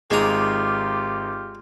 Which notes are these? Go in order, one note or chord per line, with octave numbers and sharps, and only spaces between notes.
G#1 G#3 D#4 F4 G4 A#5 D6